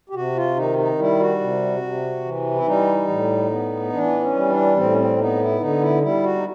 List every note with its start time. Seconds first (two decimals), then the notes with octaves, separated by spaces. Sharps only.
0.09 G4
0.15 C3 F#4
0.36 F4
0.57 D#3 D#4
0.78 D#4
0.99 G3 E4
1.20 F#4
1.41 C3
1.82 C3
2.25 E3
2.55 E4
2.67 G3 D#4
3.08 A2
3.51 B3
3.93 E3 D4
4.21 C#4
4.35 G3
4.49 D4
4.76 A2 C4
4.90 C#4
4.98 C4
5.18 B3 D#4
5.40 E4
5.60 D3 D#4
5.82 E4
6.02 G3 E4
6.23 F#4
6.35 D#4